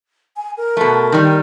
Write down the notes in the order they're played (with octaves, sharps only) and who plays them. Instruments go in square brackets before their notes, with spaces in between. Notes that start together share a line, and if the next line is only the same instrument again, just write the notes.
[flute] G#5
A#4
[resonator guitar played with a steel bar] B2 A3
D#3 G3
[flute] A#4